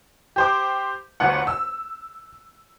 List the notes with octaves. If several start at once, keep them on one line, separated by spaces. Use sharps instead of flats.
G4 C5 D6
G1 D2 F#5
E6